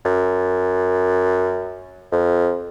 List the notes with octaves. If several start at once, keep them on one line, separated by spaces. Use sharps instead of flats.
F#2
F2